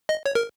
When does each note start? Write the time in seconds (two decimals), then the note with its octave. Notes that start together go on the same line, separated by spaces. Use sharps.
0.09 D#5
0.26 C#5
0.35 A#4